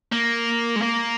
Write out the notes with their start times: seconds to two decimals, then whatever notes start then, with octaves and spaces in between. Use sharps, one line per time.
0.13 A#3
0.76 G#3
0.82 A#3